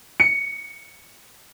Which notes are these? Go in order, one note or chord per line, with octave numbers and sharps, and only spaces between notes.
C#7